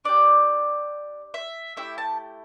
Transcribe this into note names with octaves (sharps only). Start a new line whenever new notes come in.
D4 G4 D5
E5
A3 E4 G4 E5
A5